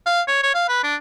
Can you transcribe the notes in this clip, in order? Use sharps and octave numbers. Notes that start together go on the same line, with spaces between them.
F5
C#5
C#5
F5
B4
D4